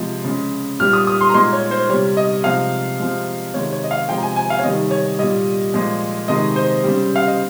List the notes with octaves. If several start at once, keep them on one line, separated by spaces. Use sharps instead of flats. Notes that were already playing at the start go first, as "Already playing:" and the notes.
Already playing: C3 F3 G#3
C#3 G#3
A#2 G3 F6
D#6
D#6
C6
A#5
A#2 G#3 C6
C#5
C5
C3 G3 C#5
D#5
C3 F3 G#3 F5
C3 F3 G#3
C3 D#3 G#3 C#5
C#5
D#5
F5
C3 F3 G#3 G5
A#5
G#5
G#5
F5
C#5
C3 D#3 G3 D#5
C#5
A#2 G3 D#5
A#2 F3 G#3
C3 D#3 G#3 D#5
C5
C#3 G3
F5
D#5